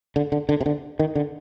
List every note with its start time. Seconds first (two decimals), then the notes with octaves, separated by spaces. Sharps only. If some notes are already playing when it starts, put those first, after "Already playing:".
0.16 D3
0.32 D3
0.49 D3
0.61 C3
0.66 D3
0.99 D#3
1.15 D3